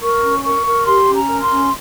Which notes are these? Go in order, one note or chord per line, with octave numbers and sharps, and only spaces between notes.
A#4 C#6
C#4
A#4 C#6
A#4
G4 C6
C#4
A#5
A#4
C6
C#4